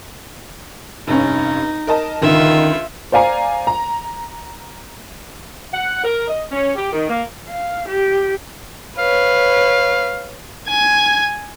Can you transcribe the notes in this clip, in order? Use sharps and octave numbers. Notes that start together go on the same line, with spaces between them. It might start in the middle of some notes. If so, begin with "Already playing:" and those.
F1 G2 C#4 D#4
A#4 D#5 A5
C#2 D3 D#3 F4 E5
C5 D5 F5 G#5 A#5
A#5
F#5
A#4
D#5
C#4
G4
D#3
A#3
F5
G4
B4 C#5 F5
G#5 G#6